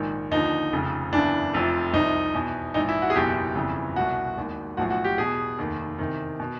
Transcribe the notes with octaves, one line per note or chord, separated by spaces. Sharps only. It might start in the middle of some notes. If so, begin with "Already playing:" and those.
Already playing: A#1 G#2 D#3
D#2 D3 F3 D#4
F1 F2 C#3
F#1 E2 C#3 E3 D4
F1 F2 C3 F3
C2 C3 F3 D#4
E2 B2
A#1 G#2 E3 D#4
E4
F#4
G#4
F#1 E2 B2 G4
G1 F2 C#3 E3
C2 B2 F#4
E1 D#2 D#3
B1 A2 F3 F#4
F#4
G4
E2 B2 G#4
F1 D#2 D#3
E2 C3 D#3
B2